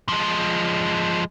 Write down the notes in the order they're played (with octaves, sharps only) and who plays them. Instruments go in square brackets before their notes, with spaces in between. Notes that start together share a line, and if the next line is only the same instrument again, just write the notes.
[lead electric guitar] F3 G#3